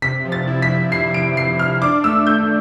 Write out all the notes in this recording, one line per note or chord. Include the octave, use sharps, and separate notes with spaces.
C3 B6
F3
A6
E4
B6
E4
E4 C7
F3 D7
C3 C7
C3 F6
D4 D6
A3 E6
A3 G6